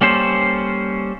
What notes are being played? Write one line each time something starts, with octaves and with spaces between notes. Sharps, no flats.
G3 A#3 C#4 A4 C5